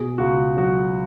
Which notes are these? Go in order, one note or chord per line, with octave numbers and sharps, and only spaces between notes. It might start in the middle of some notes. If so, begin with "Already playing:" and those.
Already playing: B2 G#4
C#2 F#4
F#3 F#4